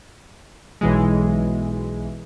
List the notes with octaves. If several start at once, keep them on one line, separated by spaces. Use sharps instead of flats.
B1 E3 G#3